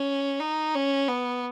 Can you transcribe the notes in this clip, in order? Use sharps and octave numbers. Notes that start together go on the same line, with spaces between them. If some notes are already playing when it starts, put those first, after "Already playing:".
Already playing: C#4
D#4
C#4
B3